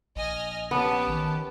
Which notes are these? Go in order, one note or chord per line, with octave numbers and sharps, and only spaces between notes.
A#1 D#5 G#5 F6
B3 C#4 G4 A5
D#3